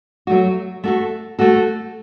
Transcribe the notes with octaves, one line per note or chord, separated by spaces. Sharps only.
F#3 A3 F#4
A3 F#4 A4
A3 F#4 A4